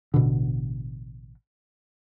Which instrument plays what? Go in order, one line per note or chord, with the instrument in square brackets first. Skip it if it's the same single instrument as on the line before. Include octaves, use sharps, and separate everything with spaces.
[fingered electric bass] A1 B2 D3